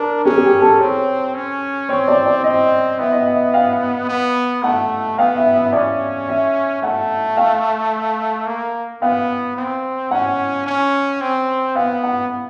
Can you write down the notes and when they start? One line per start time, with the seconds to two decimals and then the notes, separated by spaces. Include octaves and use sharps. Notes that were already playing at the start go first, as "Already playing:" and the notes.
Already playing: D4 A#4
0.25 C#4 G#4
0.37 G#4
0.44 G4
0.61 A4
0.80 C4 C#5
1.35 C#4
1.89 C4 C#5
2.08 D5
2.26 D5
2.44 C4 D#5
2.99 B3 E5
3.12 D#5
3.26 E5
3.54 F5
4.09 B3
4.64 A3 F#5
5.18 B3 F5
5.36 E5
5.55 E5
5.73 C#4 D5
6.28 E5
6.83 A3 F#5
7.37 F5
8.47 A#3
9.02 B3 F5
9.57 C4
10.11 C#4 F#5
10.66 C#4
11.21 C4
11.76 B3 F5
12.03 F#5